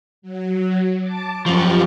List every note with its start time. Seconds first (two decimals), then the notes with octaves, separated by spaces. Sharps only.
0.22 F#3
1.01 A5 D6
1.46 F#2 F3 F4 G4